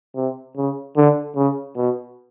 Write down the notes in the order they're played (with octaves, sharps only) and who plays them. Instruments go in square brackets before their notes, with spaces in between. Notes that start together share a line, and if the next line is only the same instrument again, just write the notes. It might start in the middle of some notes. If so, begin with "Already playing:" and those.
[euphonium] C3
C#3
D3
C#3
B2